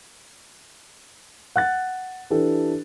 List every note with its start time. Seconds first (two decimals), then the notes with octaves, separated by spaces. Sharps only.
1.56 F#5 F#6 A6
2.30 E3 D4 G4 A4